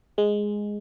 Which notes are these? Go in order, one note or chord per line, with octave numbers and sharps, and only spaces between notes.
G#3